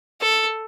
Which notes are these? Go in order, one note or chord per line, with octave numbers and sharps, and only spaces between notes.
A4